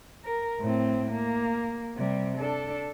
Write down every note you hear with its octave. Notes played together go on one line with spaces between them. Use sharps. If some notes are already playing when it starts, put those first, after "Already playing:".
A#4
A2 C4
A#3
C3 G3
D4 A4